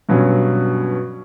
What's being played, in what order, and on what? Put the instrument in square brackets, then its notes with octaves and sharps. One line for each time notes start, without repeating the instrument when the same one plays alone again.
[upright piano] G2 B2 F#3 C#4